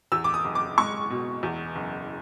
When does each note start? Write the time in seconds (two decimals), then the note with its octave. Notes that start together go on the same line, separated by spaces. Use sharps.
0.12 E2 E6
0.24 D6
0.34 D#6
0.44 F#1
0.55 D6
0.78 G#3 C#6
1.10 B2
1.43 E2
1.76 F#1